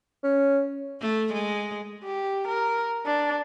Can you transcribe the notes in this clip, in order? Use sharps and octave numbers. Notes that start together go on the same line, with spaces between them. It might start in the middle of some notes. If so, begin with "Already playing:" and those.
C#4
A3
G#3
G4
A#4
D4